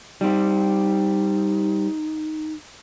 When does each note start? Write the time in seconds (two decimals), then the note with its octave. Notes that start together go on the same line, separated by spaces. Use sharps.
0.21 G3 C4 D#4